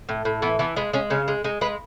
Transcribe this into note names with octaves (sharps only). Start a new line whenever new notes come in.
A2
A2
E3 B3
E3 B3
G#3 B3
G#3 C#4
C#3 C#4
G#3
G#3 D#4
G#3 B4